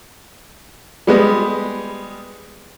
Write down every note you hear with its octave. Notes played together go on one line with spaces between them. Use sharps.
G3 G#3 B3